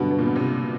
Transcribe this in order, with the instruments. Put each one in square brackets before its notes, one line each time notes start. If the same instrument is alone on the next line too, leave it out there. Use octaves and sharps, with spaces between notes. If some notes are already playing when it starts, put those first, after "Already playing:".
Already playing: [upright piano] G2 D3 F#3 B3 [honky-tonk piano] B2
[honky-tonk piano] B2
A#2
B2
C3